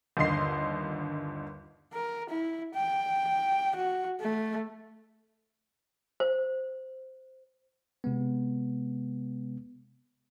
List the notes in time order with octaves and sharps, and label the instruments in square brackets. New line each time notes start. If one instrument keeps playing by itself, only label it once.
[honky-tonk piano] G1 D#2 D3 D#5 C6 C7
[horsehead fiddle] A#4
E4
G5
F#4
A3
[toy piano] C5
[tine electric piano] C3 G#3 B3